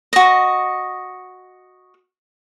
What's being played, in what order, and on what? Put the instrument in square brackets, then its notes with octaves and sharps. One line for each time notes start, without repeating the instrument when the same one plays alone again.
[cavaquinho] F#4 D#5